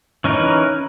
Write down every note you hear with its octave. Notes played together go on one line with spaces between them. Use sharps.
E3 C#4 D#4 A#4 B4